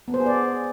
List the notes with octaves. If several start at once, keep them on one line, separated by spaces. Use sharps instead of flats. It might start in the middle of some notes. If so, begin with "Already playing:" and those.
B3
C5
G#4
D5